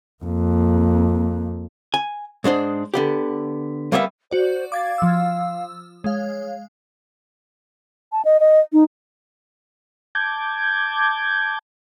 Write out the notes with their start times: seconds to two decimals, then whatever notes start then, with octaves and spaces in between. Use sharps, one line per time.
0.24 F2 A#3
1.94 G#5
2.44 G#2 G#3 D4 C5
2.94 D3 B3 G4
3.92 G3 A#3 B3 C#5 E5
4.31 F#4 C5 D5
4.72 F5 D6 G#6 A6
4.98 F3 E6
6.04 G#3 C#5 F5
8.12 A5
8.25 D#5
8.40 D#5
8.73 D#4
10.15 A5 D6 G6 G#6